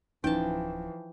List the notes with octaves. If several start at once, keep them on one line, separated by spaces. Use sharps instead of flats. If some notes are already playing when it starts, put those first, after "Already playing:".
D1 E3 F3 C#4 D#4 G5 A5